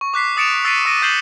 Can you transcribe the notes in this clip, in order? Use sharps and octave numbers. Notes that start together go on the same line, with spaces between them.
C#6
D6 F#6 B6 C7
D#6 A6 C#7 D7 E7 F7
E6 A6 B6 C7 D7 D#7
C#6 E6 A#6 D7 D#7
D6 G6 C7 E7 F#7 G7